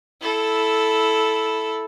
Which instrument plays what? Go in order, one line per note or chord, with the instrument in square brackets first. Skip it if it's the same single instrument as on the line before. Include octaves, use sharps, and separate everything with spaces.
[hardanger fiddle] E4 A4